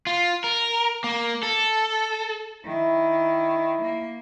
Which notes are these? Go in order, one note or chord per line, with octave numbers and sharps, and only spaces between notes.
F4
A#4
A#3
A4
D#3 E4
A#3